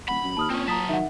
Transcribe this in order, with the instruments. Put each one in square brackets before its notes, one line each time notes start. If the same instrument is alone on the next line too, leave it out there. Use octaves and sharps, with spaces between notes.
[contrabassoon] D#1 [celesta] F#5 [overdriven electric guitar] B5
[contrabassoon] F#2
[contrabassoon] D#2 [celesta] A5 D#6 F6
[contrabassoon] A#2 [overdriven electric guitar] C4 C#4
[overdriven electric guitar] F#3 A5 [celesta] A#5 D#6 B6
[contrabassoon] D#3 [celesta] E5 F#5